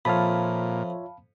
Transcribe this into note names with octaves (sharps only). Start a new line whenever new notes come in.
F2 A#2 F4 C#5 E5 F5 A5 B5